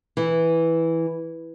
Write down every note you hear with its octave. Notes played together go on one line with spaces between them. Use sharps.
E3